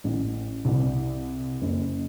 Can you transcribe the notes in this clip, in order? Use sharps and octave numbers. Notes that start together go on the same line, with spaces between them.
A1
C2
F#1